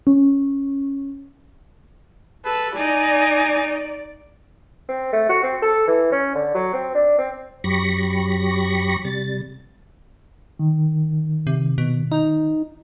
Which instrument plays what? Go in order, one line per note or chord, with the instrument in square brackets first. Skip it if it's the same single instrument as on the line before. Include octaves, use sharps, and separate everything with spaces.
[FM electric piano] C#4
[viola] A4 [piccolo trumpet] B4 [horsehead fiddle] A5
[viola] D#4 [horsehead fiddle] D5 [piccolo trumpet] G#5
[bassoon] C4
A3
F#4
C4
A4
E3
C#4
D3
F#3
C4
D4
C4
[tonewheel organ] F#2 F#3 G4 B5 C#6 A#6
C3 G3 A6
[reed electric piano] D#3
[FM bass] C3
B2
D#4